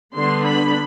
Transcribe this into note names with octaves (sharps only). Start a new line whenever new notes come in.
D3 G3 B3 D4 C6
B5